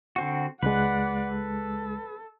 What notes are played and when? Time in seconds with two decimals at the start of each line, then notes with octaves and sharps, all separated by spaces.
0.16 D3 C4 F#4
0.63 C#2 G#3 B4 D5 F#5
1.32 A4